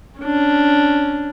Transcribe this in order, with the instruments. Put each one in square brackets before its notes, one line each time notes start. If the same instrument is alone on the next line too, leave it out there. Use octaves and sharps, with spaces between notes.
[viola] C#4 D4